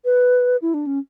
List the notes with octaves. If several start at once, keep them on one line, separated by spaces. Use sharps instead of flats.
B4
E4
D4
C#4